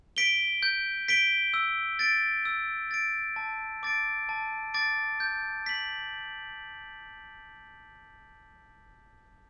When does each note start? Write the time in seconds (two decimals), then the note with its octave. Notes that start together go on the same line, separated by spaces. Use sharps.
0.17 B6 D7 G7
0.63 G6
1.08 B6 D7 G7
1.54 E6
1.99 A6 D7
2.45 E6
2.91 A6 D7
3.36 A5
3.83 D6 A6 D7
4.29 A5
4.74 D6 A6 D7
5.20 G6
5.66 B6 F#7